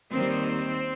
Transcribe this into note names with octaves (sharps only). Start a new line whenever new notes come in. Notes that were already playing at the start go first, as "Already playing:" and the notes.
D#2 D#3 G3 C4